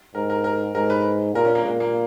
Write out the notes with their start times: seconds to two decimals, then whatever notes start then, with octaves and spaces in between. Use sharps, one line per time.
0.15 G#2 A#4
0.30 A#4
0.44 A#4
0.75 G#2 A#4
0.90 B4
1.34 A#2 A#4
1.45 C#4
1.55 A#3
1.64 A#2 G#3
1.80 A#3